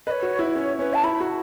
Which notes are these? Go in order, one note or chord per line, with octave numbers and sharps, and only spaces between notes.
B4 C#5 D#5
F#4
E4
C#4 C#5
C#4 B4
A5
E4 B5
F#4